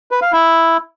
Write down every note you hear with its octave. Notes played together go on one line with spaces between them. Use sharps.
B4
F5
E4